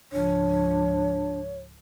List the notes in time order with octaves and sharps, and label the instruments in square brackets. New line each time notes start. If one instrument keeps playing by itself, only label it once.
[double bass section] C#2 G#2 F3 [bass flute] D4 [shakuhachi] C#5